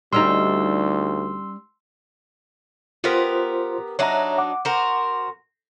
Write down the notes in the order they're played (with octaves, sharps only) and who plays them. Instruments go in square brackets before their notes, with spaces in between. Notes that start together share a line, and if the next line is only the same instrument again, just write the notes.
[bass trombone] D2 [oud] G3 C#4 D#4 [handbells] C6 E6
[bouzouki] B3 G4 A#4 [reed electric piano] F4 C5 C6
[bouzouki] F#3 D4 D#4 [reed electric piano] C#5 E5 A#5
[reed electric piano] F#5 D6
[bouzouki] F#4 A#4 C5